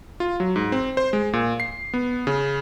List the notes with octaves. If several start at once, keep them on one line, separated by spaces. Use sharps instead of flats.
F4
F#3
G#2
C4
C5
G#3
A#2
C7
B3
C#3